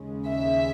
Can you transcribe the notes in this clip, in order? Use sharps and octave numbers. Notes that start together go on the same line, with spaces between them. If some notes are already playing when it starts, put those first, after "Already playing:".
Already playing: D#2 C#3 G#3
E5